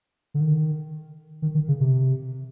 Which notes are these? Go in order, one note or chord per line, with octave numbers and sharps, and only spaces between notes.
D3
D#3
D#3
D#3
C#3
C3